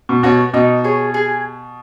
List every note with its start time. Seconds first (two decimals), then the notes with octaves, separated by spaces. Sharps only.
0.09 B2
0.23 B2 F#4 C#5
0.53 B2 D#4
0.84 G#4 C#5
1.14 G#4